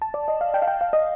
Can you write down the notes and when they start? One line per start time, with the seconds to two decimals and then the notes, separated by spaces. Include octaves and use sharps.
0.02 A5
0.14 D5
0.28 D#5
0.41 F5
0.54 G5
0.62 F5
0.68 G5
0.81 F5
0.93 D#5